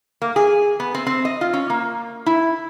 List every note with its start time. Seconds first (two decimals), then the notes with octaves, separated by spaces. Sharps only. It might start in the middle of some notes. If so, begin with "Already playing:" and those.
0.22 A#3
0.36 G#4
0.80 B3
0.95 C4
1.07 C4
1.25 D#5
1.41 F4
1.53 C#4
1.70 A#3
2.26 E4